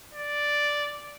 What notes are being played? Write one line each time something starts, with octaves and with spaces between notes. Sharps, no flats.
D5